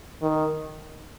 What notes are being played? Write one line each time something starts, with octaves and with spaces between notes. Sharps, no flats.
D#3